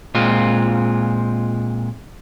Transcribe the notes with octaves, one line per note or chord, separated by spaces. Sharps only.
A#2 G#3 C4 F4